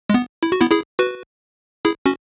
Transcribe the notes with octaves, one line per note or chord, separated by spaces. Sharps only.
G#3
B3
E4
F#4
B3 E4
E4 G#4
F#4 B4
E4 G#4
C#4 F#4